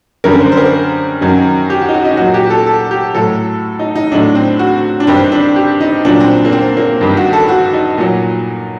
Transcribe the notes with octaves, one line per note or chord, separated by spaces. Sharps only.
F#2 D3 G3 A#4
C5
C5
A#4
F#2 D#3 F#3
G4
F#4
D#4
F#4
D#4
A#2 F#3 F#4
G4
A4
A4
G4
A2 F#3 A4
D#4
D#4
A2 F#3 D4
C4
F#4
D4
G2 D#3 G3 C4
D4
G4
D#4
A#2 F#3 D4
C4
A#3
C4
A#3
G2 D#3 G3
F#4
A4
F#4
D#4
A#2 F#3